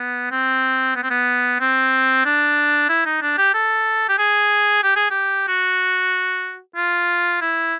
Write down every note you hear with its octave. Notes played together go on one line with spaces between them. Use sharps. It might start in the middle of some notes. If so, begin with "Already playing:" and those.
Already playing: B3
C4
B3
C4
B3
C4
D4
E4
D#4
D4
G4
A4
G4
G#4
G4
G#4
G4
F#4
F4
E4